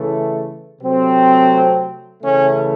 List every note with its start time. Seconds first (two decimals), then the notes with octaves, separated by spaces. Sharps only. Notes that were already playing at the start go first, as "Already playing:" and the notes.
Already playing: C#3 E3 A3
0.81 C3 F#3 A3 C4
2.21 C#3 E3 A3 C#4